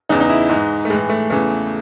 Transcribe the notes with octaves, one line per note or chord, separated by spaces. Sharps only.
E2 C#3 E3 D#4
D#4
E4
G#2 E3 D#4
A3
A2 E3 G#3
A3
E2 C#3 E3 A3